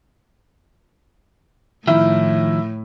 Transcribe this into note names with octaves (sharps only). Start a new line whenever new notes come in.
A2 D#3 F3 E4